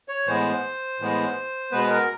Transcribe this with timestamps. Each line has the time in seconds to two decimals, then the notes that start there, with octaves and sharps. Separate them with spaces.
0.08 C#5
0.27 A2 E3 G#3 B3 C5
1.00 A2 E3 G#3 B3
1.72 B2 G#3 B3 B4
1.90 A#4